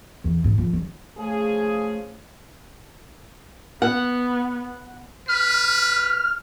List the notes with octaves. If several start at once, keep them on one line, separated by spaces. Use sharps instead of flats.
E2
G#2
F2
F#3
C#3 F3 A3 G#4
B3 F#5
B4 F6